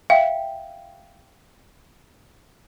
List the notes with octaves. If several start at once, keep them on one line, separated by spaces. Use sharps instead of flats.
E5 F5 G5